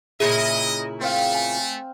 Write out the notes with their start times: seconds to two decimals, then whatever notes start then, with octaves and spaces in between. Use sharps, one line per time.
0.20 A#2 C#3 E4 G#4 D#5
1.01 A3 C4 F5
1.35 G#5